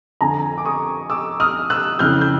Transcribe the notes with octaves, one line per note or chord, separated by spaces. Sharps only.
F2 D3 G#5 A#5
D6
C#6 D#6
D6 E6
D#6 F6
E6 F#6
F2 C#3 E3 F6 G6
G6